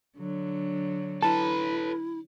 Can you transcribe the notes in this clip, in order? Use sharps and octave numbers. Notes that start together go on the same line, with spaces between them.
D3 F#3
E4 A4 B4 A5